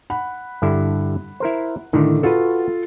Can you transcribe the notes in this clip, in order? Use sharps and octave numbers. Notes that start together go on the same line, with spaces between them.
F#5 B5
G2 D3 E4
E4 A#4 C5
A2 D3 D#3
F4 F#4 A4 B4